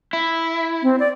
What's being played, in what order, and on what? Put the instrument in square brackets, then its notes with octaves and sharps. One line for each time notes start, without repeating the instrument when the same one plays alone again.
[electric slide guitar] E4
[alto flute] C4
D5